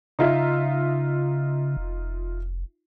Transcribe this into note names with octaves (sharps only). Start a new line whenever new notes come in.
C#3 D#4 F4 E5
F1